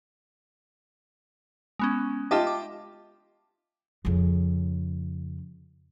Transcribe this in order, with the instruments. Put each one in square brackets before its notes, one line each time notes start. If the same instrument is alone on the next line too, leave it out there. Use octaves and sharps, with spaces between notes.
[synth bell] G#3 B3 C#4
[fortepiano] F4 G4 D#5 [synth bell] E5 A5 D6
[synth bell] D6
[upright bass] F2 C#3